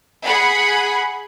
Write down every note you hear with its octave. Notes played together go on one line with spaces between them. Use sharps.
G#4 F#5 B5